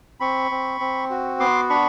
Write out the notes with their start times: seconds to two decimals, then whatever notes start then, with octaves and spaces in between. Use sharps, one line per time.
0.20 C4 B5 C#6
0.51 C4
0.80 C4
1.10 F#4
1.40 B3 C6 D6
1.69 D4 B5 C#6